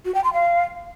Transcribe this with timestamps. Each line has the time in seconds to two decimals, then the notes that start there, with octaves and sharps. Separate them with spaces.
0.05 F#4
0.15 G5
0.24 C6
0.33 F5